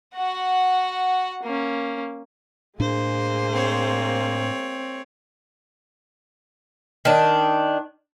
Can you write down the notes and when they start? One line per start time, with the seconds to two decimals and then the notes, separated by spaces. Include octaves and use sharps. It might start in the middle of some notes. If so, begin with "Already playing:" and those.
0.15 F#4 F#5
1.43 A#3 C#4
2.80 A2 G#3 A#3 D4 G#4 C5
3.53 C4 C#5
7.05 D#3 D4